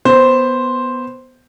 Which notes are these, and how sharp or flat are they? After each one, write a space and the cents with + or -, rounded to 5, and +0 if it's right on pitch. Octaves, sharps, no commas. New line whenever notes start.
B3 +0 C5 +0